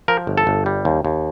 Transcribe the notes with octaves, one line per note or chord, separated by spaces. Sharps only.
F3 A#4
G1
A4
G1
G3
D#2
D#2